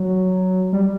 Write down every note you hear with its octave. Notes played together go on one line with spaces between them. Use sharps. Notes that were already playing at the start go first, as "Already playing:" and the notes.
Already playing: F#3
G3